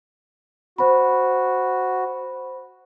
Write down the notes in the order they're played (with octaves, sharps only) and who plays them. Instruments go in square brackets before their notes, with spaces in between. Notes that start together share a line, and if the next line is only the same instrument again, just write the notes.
[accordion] F#4 [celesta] C5 B5